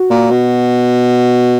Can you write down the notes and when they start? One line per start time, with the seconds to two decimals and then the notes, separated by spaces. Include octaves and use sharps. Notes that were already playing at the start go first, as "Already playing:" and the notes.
Already playing: F#4
0.10 A#2
0.30 B2